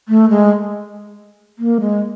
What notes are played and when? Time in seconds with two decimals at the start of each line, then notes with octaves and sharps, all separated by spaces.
0.08 A3
0.30 G#3
1.59 A#3
1.80 G#3